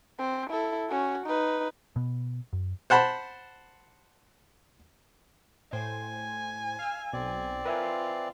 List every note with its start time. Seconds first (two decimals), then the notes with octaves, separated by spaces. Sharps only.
0.18 C4
0.50 E4 A4
0.89 C#4 F#4
1.26 D#4 B4
1.96 B2 B3
2.53 F#2
2.90 C5 F#5 A5 B5
5.73 A2 C5 G5 G#5
6.79 F5 E6 F6
7.13 B1 C4 D5
7.65 F4 A#4 B4 E5 G#5